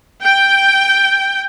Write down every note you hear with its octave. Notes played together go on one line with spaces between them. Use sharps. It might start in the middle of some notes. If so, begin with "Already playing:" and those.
G5